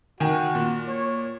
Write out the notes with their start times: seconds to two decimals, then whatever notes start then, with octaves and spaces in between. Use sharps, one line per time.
0.20 D#3 F#4 G#5
0.55 A#2
0.88 C#5